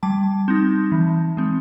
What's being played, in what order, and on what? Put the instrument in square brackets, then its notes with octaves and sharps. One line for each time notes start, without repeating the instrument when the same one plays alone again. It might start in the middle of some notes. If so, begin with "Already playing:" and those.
[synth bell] G3 A5
C4 D#4
E3
G#3 C4